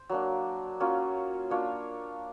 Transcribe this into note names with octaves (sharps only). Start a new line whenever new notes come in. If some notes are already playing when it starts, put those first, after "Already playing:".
Already playing: C5
F#3 A#3 D4
F#3 A#3 C#4 F4
A#3 D4 F4 C#5